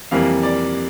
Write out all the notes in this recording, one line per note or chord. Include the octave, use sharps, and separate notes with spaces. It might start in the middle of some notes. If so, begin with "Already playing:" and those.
F2 C3 E3 G3 A#3 F5
D5